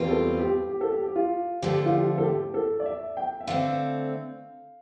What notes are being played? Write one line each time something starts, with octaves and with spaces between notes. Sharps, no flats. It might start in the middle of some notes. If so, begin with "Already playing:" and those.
Already playing: E2 B2 G3 C4 F4
A4
G4
G4
A4
G4
G4
F4
D3 F3 A3 G4
F4
G4
A4
G4
A4
D5
E5
G5
E5
D3 A3 C4 F5